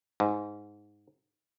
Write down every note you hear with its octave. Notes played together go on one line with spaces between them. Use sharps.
G#2